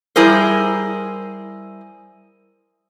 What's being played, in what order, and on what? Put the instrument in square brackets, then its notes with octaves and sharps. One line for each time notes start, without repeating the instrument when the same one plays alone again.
[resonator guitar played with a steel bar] G3 E4 G#4 A#4 C5